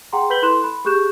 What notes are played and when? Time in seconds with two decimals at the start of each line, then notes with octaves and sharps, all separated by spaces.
0.13 G#4 F#5 G5 A#5 C6
0.30 B4 B5 G6 B6 F#7 G7
0.42 E4 A4 C6 F#6 E7
0.64 B5
0.85 G4 G#4 C#6 F#6 G6 E7